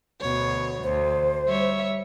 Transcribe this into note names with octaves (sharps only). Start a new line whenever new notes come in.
D2 B2 C#5
D2 C5
G3 C#5 E5